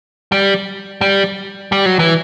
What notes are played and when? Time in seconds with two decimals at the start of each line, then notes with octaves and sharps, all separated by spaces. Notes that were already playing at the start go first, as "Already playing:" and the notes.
0.32 G3
1.01 G3
1.72 G3
1.85 F#3
1.99 E3